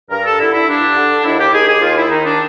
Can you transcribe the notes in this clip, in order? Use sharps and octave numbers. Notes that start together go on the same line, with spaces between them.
G2 A#4
A4
D3 E4
E4
G2 D4
D3
D#2 E4
G4
D#3 G#4
G#4
D#2 F4
E4
D#3 D#4
D4